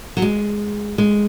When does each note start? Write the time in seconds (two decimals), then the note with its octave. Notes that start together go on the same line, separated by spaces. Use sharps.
0.17 F#3
0.22 G#3
0.98 G#3